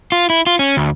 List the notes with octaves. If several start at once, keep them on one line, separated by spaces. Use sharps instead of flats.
F4
E4
F4
C#4
D2